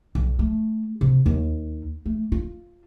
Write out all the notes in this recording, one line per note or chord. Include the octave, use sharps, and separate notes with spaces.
B1
A3
C3
D#2
A3
F4